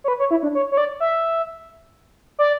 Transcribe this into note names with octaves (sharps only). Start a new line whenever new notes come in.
C#5
B4
C#5
E4
D4
C#5
C#5
D5
E5
D5